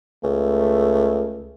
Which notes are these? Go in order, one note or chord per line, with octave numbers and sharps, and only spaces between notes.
C#2 A3